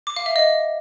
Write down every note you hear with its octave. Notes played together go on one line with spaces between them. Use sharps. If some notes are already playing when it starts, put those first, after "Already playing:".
D6
F5
E5
D#5